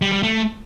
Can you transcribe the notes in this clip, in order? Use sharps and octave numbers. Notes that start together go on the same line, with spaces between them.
G3
G3
A3